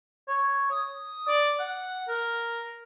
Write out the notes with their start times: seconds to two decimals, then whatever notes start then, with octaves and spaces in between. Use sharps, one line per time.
0.28 C#5
0.71 D#6
1.28 D5
1.60 F#5
2.08 A#4